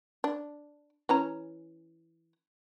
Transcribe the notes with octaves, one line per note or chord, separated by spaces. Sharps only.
D4
E3 C#4 A#5